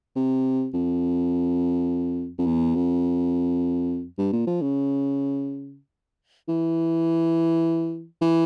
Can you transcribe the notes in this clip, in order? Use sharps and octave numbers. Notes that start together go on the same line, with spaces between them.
C3
F2
F2
E2
F2
G2
A#2
F3
C#3
E3
E3